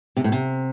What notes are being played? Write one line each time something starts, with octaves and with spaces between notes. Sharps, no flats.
C3
A2
C3